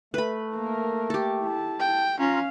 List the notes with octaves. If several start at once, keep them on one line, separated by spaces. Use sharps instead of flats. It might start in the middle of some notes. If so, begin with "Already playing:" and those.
A3 B4 B5
A#3 A#4
G4 A4
E4 A5
G5
C#4 F4 F5 A#5